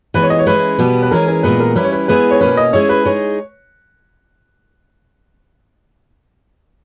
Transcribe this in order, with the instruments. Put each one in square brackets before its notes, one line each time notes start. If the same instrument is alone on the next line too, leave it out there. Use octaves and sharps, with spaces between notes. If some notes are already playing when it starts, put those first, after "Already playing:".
[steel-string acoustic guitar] E3 G#3 B3 [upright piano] B4
[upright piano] C#5
D#5
C#5
[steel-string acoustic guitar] G#3 C#4 E4 [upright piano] B4
[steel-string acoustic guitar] B2 G3 B3 G4
[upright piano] B4
[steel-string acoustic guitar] E3 G#3 C#4 G#4 [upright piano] A#4
[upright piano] A#4
[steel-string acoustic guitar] A#2 G#3 B3 [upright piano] B4
[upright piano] A#4
[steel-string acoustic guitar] G3 C#4 E4 [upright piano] B4
[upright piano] C#5
B4
[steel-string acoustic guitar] G#3 B3 E4 G#4 [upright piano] B4
[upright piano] C#5
[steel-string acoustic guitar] B2 A#3 C#4 [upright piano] B4
[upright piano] D#5
[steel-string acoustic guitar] G#3 C#4 E4 G#4 [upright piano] C#5
[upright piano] B4
[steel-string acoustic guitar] G#3 D#4 G#4 [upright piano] C#5